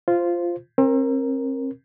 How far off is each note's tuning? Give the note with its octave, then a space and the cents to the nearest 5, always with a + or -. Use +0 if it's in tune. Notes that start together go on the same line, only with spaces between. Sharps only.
F4 -10 C5 +0
C4 +40 A#4 +0